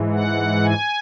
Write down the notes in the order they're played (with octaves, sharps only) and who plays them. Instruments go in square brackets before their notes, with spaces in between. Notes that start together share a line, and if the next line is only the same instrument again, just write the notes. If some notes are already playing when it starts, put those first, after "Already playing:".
Already playing: [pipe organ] G#2 E3
F#5
G#5